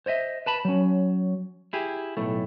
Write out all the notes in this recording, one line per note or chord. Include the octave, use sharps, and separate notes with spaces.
C5 C#5 D#5 E5
B4 A5 B5
F#3 C#4
E4 G4 G#4
B1 A2 A3